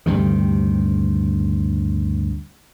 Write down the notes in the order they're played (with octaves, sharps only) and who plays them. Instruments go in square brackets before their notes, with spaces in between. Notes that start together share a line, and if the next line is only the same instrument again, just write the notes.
[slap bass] D2 G2 C3 D#3